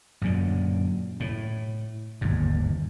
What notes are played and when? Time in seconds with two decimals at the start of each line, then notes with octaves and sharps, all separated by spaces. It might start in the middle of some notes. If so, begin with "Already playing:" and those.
0.22 F#2 A#2 D3
1.20 A2
2.21 G1 D#2 G#2